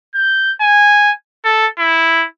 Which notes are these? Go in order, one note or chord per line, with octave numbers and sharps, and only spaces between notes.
G6
G#5
A4
E4